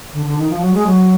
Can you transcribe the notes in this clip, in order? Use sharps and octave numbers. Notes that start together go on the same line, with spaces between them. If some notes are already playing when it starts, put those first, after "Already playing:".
D3
D3
D#3
F3
F#3
G#3
F#3